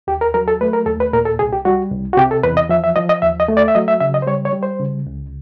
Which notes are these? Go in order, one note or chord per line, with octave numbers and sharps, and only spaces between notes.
D#2 G4
A#4
F#3 A#4
A4
A3 B4
A#4
D#2 A4
B4
A#2 A#4
A4
C2 G#4
G4
G3 F#4
C2
F#4
C3 G4
A4
E2 B4
D#5
F3 E5
E5
F3 D#5
D#5
D#2 E5
D#5
A3
D5
E5
F#3 D#5
E5
C#3 E5
D#5
C5
G3 C#5
C#5
G3
C5
C#3
C#2